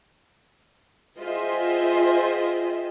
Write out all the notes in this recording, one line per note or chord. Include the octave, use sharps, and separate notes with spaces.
F4 G#4 C5 D#5 E5 G5